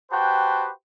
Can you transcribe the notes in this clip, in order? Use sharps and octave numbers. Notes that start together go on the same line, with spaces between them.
F#4 G4 B4 C5 G5 A5